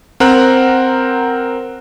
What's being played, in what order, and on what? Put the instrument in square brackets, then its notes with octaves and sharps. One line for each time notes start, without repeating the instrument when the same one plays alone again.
[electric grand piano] C4 A#4 F#5 A#5 F#6